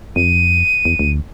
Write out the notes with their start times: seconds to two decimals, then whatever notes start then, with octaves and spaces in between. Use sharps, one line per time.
0.16 F2 D#7
0.85 E2
0.99 D2